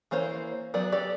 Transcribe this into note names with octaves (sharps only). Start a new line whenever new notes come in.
E3 A#3 C5 C#5
F#3 B3 D5
G4 A4 D5